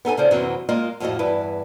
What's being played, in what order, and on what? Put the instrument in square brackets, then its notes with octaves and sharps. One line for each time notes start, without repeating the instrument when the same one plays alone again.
[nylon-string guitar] B3 D#4 A4 G#5
C#3 F4 A4 C5 D5
F#2 C3 E3 B3 C4 F#4
G#3 A#3 F4 D#5
F2 A2 F3 E4 F#4 D#5
E2 G2 E4 B4